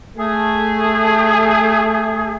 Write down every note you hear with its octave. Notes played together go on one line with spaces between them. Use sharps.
A3 G#4